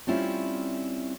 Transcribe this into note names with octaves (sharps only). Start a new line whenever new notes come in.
G3 A3 C4 C#4 E4 F4